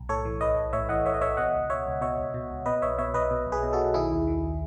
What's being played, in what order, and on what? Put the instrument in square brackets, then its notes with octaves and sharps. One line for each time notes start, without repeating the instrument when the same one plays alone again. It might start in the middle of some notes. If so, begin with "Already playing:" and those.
Already playing: [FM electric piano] B1
A2 A4 C#5
E3
A1 B4 D#5
A1
A2 C#5 E5
E3 D#5 F#5
A1 C#5 E5
D#5
A1 C#5 E5
B2 D#5 F#5
C#2
B2 C#5 E5
C#2
B2 C#5 E5
C#2
B2
C#2
B2 B4 D#5
B1 C#5 E5
B2 C#5 E5
B1 B4 D#5
B2
B1
G#4 B4
B2
F#4 A4
B1
D#3 E4 G#4
D#2
D#3